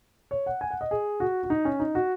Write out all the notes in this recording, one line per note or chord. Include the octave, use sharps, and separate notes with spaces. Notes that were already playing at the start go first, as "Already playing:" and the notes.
C#5
F#5
G#5
F#5
D#5
G#4
F#4
F#4
D#4
C#4
D#4
F#4